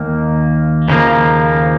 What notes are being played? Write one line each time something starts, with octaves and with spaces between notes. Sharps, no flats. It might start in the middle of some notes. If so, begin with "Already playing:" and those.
Already playing: D#2 D#3 A#3
D#2 C#3 F3 A#3